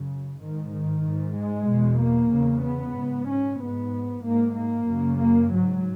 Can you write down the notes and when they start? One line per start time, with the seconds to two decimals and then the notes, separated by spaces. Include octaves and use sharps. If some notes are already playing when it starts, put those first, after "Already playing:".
Already playing: F#2 C#3
0.40 G#2 D#3
0.72 D#3
1.04 G#2
1.36 G#3
1.68 E2 B2
2.01 A#3
2.32 E2 C#3
2.64 B3
2.96 G#2
3.29 C#4
3.60 G#2 B3
4.25 G#2 A#3
4.56 A#3
4.89 F#2 C#3
5.21 A#3
5.53 G#2 F#3